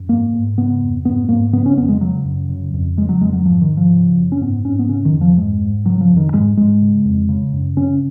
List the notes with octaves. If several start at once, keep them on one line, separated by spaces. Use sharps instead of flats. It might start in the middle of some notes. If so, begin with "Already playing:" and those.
Already playing: F#2
G#2 A#3
G#2
C#3 B3
F2
G#2 B3
G#2 A#3
C#3 B3
C#4
F2 B3
G#3
C#3 F#3
F#2
C#3
F2
C#3 G#3
F#3
F2 G#3
F#3
G#2 F3
D#3
G#2
F3
C#3
F#2
C#4
G#2 B3
G#2 C#4
B3
C#3 C#4
D#3
F2
F3
G#2 G#3
G#2
C#3 F#3
F3
F2
D#3
G#2 G#3
G#2 G#3
C#3
F2
C#3
F#2
C#3 C#4